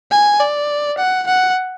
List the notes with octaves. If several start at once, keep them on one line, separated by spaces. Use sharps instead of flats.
G#5
D5
F#5
F#5